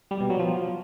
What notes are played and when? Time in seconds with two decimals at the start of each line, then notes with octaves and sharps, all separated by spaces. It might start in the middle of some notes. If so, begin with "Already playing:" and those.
0.11 G3
0.20 B2
0.30 F#3
0.39 F3